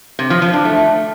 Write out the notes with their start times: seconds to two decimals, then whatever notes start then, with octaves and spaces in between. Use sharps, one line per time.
0.19 C3
0.30 F3
0.42 F3
0.53 D4
0.65 A3